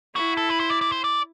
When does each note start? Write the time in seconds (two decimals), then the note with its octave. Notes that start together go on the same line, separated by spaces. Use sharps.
0.15 E4 F#4
0.37 A4
0.49 B4
0.60 C5
0.70 D5
0.81 D5
0.92 C5
1.04 D5